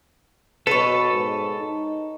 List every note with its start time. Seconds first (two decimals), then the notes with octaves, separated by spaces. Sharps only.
0.67 B2 A4 B4 C#5
1.11 G#2
1.59 D#4